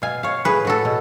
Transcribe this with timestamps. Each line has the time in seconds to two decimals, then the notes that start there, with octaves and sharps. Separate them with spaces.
0.02 B2 F5 G#5
0.23 B2 C#5 F5
0.45 A2 G#4 B4
0.65 A2 F#4 A4
0.85 B2